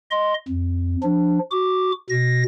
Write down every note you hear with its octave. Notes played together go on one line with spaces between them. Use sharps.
D#5 C6
F2
F3 D4
F#4 D6
B2 A#6